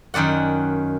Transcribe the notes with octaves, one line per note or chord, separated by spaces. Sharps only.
F#2 D#3 D5 F#5